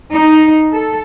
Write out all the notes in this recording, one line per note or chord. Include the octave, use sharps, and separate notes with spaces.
D#4
A4